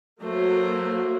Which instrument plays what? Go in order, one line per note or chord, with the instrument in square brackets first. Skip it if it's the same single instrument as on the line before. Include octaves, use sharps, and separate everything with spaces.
[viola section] F#3 A#3 [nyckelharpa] A3 C5